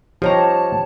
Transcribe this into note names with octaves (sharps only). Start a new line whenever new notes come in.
F3 D#4 G4 C#5 A5 A#5